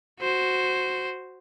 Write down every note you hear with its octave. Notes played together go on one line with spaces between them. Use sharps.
F#4 C5